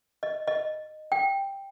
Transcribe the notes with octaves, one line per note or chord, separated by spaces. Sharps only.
D#5
D#5
G5